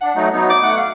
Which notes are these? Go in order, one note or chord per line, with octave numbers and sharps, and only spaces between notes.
D4 F#5
F#3 A3 D#4
F#3 B3 D#4
D6
A3 F#5
F5